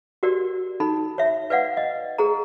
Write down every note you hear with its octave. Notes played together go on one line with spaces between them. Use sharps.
F#4 G4 A#4 D5
D#4 A4 B5
C#5 E5
B4 D5 F5 F#5
D#5
G#4 A4 A#5